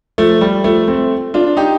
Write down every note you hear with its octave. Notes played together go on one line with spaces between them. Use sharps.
F3 A3
G3
F3 A3
A3 C4
D4 F4
D#4 G4